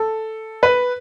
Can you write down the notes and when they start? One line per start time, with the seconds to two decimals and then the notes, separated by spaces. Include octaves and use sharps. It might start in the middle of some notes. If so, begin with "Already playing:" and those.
Already playing: A4
0.63 B4